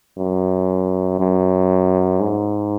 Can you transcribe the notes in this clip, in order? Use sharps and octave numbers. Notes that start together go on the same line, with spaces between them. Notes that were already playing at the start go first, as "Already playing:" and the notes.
F#2
F#2
G#2